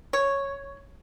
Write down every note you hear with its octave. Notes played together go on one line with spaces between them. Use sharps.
C#5